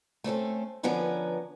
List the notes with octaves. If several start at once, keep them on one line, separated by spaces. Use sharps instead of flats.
A3 C4 C#4 A4
D3 F3 B3 C#4 A#4 B4